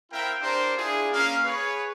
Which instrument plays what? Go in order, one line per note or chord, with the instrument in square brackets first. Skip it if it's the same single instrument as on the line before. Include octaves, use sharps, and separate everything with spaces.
[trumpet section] C4 E4 A#4 E5 F5 G5
D4 G4 A#4 C5
D4 E4 F4 G#4
A#3 C#4 F5
G#4 B4 C#5